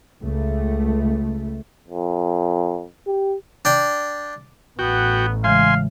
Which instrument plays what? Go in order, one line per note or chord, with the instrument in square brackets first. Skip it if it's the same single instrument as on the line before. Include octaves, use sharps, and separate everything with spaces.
[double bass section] C#2 A3
[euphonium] F2
G4
[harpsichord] D4 G5 C6
[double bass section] A1 [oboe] B3 [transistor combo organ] F#4 G5
[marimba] C#3 E3 G#3 [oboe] F5 [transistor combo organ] G#5 C6